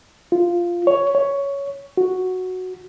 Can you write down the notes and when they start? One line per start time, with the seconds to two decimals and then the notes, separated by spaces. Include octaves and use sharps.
0.32 F4
0.87 C#5
1.15 C#5
1.97 F#4